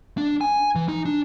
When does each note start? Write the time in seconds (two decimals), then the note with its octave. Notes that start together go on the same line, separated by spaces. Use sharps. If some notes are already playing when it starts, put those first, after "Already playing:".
0.18 D4
0.41 G#5
0.75 E3
0.89 D#4
1.05 D4